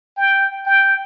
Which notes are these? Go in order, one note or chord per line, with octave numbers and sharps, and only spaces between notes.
G5
G5